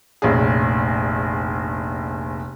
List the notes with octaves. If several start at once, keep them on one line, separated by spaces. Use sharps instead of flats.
F1 A#1 C#4 G#4